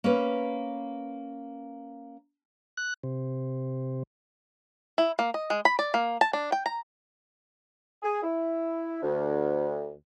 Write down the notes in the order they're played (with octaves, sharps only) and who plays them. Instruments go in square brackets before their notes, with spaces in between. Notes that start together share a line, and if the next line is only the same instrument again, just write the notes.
[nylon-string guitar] A#3 C#4 B4
[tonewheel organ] F#6
C3
[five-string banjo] E4
A#3
D#5
G#3
B5
D5
A#3
A5
D4
G5
A#5
[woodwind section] G#4
E4
D2